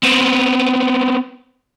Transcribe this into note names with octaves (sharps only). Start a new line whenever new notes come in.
B3 C4